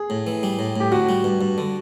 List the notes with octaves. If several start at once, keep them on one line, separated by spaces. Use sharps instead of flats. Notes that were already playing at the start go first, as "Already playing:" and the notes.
Already playing: G#4
A2
E3
G3
A2
A2 G4
D3 F#4
G3
G2
G2
D3